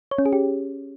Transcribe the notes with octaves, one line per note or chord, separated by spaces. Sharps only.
C#5
C#4
G#4
G4